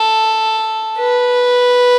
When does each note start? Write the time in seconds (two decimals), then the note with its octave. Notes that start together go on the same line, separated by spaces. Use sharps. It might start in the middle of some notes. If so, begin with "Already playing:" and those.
Already playing: A4
0.99 B4